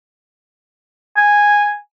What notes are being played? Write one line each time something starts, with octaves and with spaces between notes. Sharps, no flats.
G#5